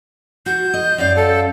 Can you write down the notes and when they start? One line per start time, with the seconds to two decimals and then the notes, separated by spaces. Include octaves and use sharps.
0.46 F#4 G6
0.74 D#5
0.98 F#2 D5 F5
1.16 A4